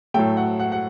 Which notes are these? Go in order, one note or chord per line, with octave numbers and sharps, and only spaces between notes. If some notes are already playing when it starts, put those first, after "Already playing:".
A2 F#3 A3 G5
F#5
F#5
F#5